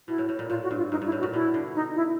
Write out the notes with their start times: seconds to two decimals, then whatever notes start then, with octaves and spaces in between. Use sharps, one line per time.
0.08 B2 E4
0.18 A2
0.29 A2
0.39 A#2
0.50 A2 F4
0.63 F#4
0.71 G2
0.77 F4
0.91 G2 D#4
1.02 G2 E4
1.12 A2
1.19 F#4
1.23 A#2
1.33 B2 E4
1.54 D3
1.75 D#4
1.96 E4